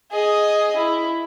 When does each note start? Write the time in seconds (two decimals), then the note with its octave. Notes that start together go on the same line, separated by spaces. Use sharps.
0.11 G#4 D#5
0.76 E4